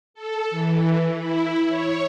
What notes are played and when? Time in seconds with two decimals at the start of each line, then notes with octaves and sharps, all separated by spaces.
0.14 A4
0.50 E3
1.16 E4
1.69 C#5